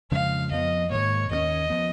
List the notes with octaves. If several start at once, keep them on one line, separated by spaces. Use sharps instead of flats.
F2 C#3 F3 G#3 F5
F2 F3 B3 D#5
G#2 D#3 A#3 C#5
D#2 D#3 A#3 C#4 D#5
F3 B3